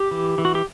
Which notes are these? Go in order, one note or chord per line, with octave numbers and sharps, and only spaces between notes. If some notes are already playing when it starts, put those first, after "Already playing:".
Already playing: G4
E3
E3
F#4
G4